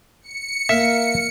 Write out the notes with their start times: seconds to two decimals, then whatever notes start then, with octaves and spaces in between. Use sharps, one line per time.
0.22 C#7
0.69 A#3 E5